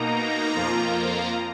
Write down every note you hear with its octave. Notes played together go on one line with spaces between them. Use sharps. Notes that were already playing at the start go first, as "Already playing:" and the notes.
Already playing: B2 A#3 D#4 A#5
F2 F3 A#3 F4